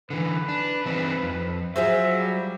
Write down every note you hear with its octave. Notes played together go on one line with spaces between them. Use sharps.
D3 E3 B4
D4
E3 C4 D#4
F2
F#3 F4 G#4 C5 E5
G3